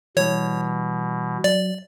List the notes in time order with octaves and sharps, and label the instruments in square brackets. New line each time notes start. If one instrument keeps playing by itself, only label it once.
[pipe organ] B2 [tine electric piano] E3 G3 [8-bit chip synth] C#5
[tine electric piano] F#3 [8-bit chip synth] D5